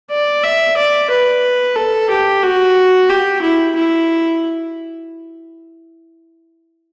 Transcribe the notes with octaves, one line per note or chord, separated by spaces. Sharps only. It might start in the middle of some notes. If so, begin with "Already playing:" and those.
D5
E5
D5
B4
A4
G4
F#4
G4
E4
E4